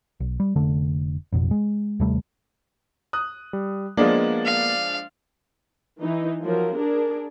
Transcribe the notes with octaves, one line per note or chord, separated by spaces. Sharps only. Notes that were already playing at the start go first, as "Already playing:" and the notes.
B1
G3
F1 D3 A3 D4
A1 F2 B2
G#3
D#2 C3 G3 A3
D#6 F#6
G3
F3 G#3 A#3 B3 D4 D#5
F5
E3 D#4
F3 F#3 A#4
D4 G#4 A#4